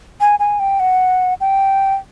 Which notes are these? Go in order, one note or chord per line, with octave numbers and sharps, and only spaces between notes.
G#5
G#5
G5
F#5
G5